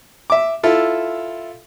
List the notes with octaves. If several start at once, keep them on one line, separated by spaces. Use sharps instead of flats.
E5 D6
E4 F4 A4